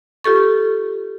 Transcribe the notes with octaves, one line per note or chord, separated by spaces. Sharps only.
F4 G4 A4 C#6